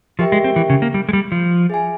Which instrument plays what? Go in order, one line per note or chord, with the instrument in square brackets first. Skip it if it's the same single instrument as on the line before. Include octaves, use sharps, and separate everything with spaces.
[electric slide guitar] F3 [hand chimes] G4 A#4 E5 G5
[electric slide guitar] G#3
C4
E3
C#3
A#3
G3
G#3
G3
F3
[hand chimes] G#4 E5 G#5